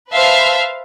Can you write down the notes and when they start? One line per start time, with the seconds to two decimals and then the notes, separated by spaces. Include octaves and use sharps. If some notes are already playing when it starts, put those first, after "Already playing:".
0.11 B4 C5 E5 F5 A5